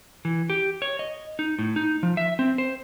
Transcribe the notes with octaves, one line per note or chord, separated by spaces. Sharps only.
E3
G4
C#5
D#5
D#4
A2
D#4
F3
E5
C4
C5